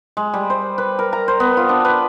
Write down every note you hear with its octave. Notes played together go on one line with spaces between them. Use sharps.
G#3
G3
C5
B4
A#4
A#5
C5
B3
F4
D4
B4